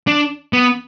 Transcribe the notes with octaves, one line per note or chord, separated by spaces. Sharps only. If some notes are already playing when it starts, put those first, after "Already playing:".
D4
B3